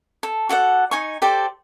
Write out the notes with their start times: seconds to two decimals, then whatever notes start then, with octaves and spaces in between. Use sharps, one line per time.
0.23 A4
0.49 F#4 A4 D5 F#5
0.91 D#4 G#5 C#6
1.22 G4 A4 C5 D5